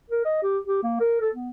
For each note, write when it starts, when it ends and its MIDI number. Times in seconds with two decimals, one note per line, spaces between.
0.10 0.23 70
0.25 0.39 75
0.42 0.58 67
0.67 0.80 67
0.83 0.96 58
1.00 1.17 70
1.21 1.29 69
1.34 1.51 59